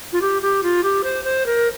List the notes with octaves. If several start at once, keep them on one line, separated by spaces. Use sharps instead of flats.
F4
G4
G4
F4
G4
C5
C5
A#4